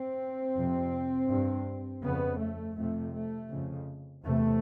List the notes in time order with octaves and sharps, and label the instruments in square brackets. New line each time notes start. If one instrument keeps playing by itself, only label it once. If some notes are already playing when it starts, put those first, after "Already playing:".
Already playing: [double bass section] C4
F2 C3
G2
F2 C#3 B3
A3
F2 C3 A3
A3
F2 C#3
E2 C3 A3